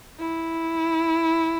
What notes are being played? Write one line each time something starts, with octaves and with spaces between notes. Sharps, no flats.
E4